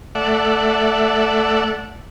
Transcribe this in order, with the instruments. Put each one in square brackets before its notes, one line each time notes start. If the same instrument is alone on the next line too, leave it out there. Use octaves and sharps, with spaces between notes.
[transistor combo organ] A3 D5 E5 F#5